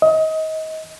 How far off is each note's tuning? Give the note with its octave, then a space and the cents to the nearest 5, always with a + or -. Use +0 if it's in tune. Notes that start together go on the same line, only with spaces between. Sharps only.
D#5 +25